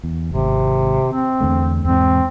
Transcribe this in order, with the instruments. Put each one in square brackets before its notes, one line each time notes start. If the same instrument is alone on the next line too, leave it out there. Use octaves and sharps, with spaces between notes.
[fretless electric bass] E2
[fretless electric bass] D1 G#1 [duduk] C3
[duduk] C4
[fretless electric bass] E2 D3 A3
[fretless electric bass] E2 G#2 [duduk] C4